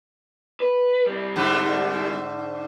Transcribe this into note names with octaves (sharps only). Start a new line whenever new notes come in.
B4
C2 G3
G#2 D3 A3